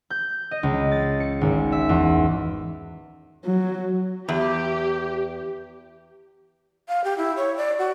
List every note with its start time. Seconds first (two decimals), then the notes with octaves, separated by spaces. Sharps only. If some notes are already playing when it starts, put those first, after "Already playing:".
0.10 G6
0.51 D#5
0.63 C#2
0.92 A6
1.20 C#7
1.41 G#1
1.72 E5
1.89 E2
3.45 F#3
4.29 E2 G4
6.88 F5
7.04 G4
7.18 E4
7.37 C#5
7.57 D5
7.79 F#4